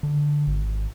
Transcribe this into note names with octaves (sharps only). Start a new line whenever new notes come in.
D3
G#1